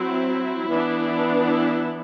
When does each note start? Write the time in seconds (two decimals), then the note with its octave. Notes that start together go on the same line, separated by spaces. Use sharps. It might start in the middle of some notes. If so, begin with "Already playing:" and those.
Already playing: F#3 C4 E4
0.68 E3 B3 D4
1.44 E4